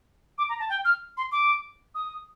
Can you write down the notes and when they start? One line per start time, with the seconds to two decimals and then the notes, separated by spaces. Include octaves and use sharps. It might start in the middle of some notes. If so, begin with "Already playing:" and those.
0.38 D6
0.49 A#5
0.60 A5
0.69 G5
0.85 F6
1.17 C6
1.32 D6
1.95 D#6